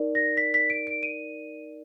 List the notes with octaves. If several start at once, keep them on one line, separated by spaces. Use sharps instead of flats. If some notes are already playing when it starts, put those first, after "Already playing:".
Already playing: D#4 A#4 D5
A#6
B6
B6
D7
D7
D#7